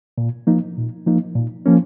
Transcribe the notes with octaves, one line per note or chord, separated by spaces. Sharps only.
A#2
F3 A#3 D#4
A#2
F3 A#3 D#4
A#2
F3 A#3 C#4